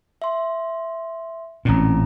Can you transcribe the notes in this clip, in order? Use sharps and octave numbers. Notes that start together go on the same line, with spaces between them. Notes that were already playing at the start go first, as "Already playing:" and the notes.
E5 C6
A1 A#2 C4 C#4 A#5